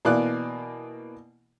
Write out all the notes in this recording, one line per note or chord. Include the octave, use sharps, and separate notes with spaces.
B2 E3 A#3 D5 F#6